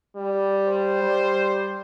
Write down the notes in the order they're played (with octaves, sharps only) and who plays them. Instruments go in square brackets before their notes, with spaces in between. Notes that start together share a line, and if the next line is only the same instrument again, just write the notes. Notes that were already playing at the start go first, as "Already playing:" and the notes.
[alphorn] G3
[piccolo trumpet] C5
[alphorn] G3